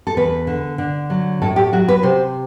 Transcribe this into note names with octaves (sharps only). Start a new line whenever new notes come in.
A4
E2 B4
D3
D3
F#3
A2 A4
G4
F#3 F#4
B4
C3 C5